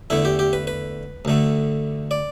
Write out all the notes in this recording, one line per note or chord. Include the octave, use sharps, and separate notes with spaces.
E2 D3 A3 E4
G4
G4
B4
B4
D2 D3 A3
D5